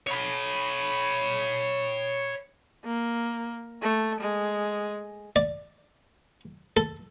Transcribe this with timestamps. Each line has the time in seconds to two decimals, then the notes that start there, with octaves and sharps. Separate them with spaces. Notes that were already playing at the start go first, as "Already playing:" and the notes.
0.07 C#5 B5
2.85 A#3
3.82 A3
4.21 G#3
5.36 D5
6.77 A4